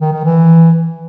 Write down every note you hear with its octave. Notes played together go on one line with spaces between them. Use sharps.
D#3
D#3
E3